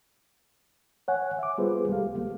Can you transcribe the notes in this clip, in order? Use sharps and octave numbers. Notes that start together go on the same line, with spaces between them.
C#5 F#5 G#5
E5 D6
G3 B3 F4 G#4 B4 C5
C2 G#3 G4 A4 F5
G#3 A#3